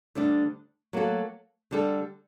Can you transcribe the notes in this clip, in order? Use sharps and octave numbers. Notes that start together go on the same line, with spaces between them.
D2 D3 G3 D4
F#3 A#3 F#4 A4
D3 G3 D4 A4